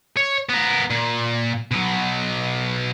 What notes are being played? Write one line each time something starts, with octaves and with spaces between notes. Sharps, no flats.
C#5
B3 A#4
A#2
B2 F#3